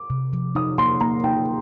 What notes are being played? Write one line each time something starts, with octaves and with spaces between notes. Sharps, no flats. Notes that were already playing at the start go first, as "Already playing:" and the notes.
Already playing: D6
C3
F3
D#4 D#6
A#3 C6
A#3 A#5
D#4 G5